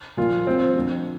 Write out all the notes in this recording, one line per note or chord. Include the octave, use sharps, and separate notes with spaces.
A#2 F3 F4
A#2 F3 C4
F2 D3 F3